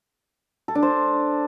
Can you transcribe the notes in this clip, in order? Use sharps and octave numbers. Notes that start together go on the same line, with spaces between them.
A4
D4
C5